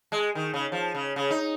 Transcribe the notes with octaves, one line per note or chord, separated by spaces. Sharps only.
G#3
D#3
C#3
F3
C#3
C#3
D#4